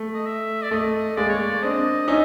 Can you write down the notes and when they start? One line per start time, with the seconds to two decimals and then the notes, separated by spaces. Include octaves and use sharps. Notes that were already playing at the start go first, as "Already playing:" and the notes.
Already playing: A3
0.15 D#5
0.26 E5
0.62 D5
0.71 A3 D#5
1.17 G#3 A#3 D5
1.29 C#5
1.40 D5
1.62 C4 D4 D#5
2.08 C#4 D#4 E5